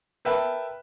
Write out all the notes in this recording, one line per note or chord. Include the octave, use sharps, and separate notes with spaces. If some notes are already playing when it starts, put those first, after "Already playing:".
A#4 B4 E5 G5 A5